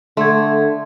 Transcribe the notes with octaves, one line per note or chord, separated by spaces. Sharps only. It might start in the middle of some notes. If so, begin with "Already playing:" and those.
D3 A3 C6 G#6